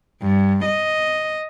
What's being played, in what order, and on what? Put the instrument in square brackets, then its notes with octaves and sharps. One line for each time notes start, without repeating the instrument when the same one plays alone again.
[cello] G2
D#5